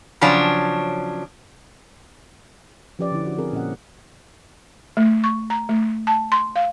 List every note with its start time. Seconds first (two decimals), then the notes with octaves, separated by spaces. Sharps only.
0.21 C#3 F3 F#3 C#4 D4 C#5
2.99 F3 C#4 G4 B4 D5
3.12 D3 E4
3.26 F#4
3.38 C4 G#4 A#4
3.52 A#2 C#4 D#5 F#5
4.97 A3
5.24 C#6
5.50 A#5
5.69 A3
6.07 A5
6.32 C6
6.56 F5